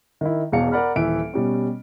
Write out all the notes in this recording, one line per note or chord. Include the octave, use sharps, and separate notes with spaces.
D#3 E4
E1 E2 B2 F5 C#7
A#4 D5 F#5 B5 F6
D#1 E3 E5 D7
B2 G3 C#4